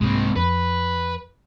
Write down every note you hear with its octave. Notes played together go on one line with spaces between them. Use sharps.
C2 G#2 G#3 A#3 C4
F2 B4